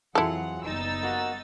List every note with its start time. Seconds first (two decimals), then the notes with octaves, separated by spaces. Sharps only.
0.15 F2 E3 F#3 E4 F4 G#4 A4 F#5
0.64 F#1 G3 B3 D#4 E6 A6
1.03 A#3 F#4